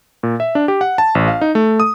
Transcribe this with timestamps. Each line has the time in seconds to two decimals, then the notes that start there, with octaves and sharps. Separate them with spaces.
0.23 A#2
0.40 E5
0.55 D4
0.68 G4
0.81 F#5
0.98 A5
1.15 A1
1.28 F5
1.41 D#4
1.55 A3
1.80 D#6